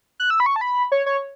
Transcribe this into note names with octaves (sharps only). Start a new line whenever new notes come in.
F#6
E6
B5
C#6
A5
B5
C#5
C#5